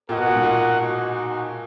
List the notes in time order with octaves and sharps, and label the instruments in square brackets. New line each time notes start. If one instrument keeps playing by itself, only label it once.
[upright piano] A#2 [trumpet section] F#4 A#4 D#5 F#5
[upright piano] B2
A#2
G#2
A#2
[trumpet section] G#3 D#4 F#4